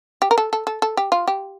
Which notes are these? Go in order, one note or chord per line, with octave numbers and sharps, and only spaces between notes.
G4
A#4
A4
A4
A4
A4
G4
F4
G4